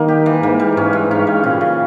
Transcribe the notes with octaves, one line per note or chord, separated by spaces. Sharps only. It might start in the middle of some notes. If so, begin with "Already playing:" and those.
Already playing: D#3 G3 A#3 D#4
G4
E3
G#2 A#3
G3
G#2 C#4
G2
G#2 C#4
G3
A#2 C#3
C#3